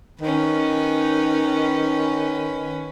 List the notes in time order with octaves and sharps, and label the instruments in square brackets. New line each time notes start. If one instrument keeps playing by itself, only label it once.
[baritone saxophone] D#3 [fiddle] C#4 B4